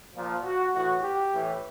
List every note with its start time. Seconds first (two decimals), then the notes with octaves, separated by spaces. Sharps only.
0.16 A#2 F3
0.45 F#4
0.74 A2 E3 F#4
1.03 G4
1.33 A2 E3